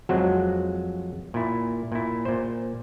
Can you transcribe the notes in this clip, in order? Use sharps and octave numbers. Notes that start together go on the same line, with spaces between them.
F2 F#3 G#3 F#4 C5
A#2 E4
A#2 E4
A#2 C5